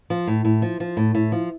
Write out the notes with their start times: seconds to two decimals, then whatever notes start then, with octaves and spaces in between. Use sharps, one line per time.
0.10 F3
0.27 A2
0.45 A2
0.62 F3
0.80 F3
0.97 A2
1.15 A2
1.32 F3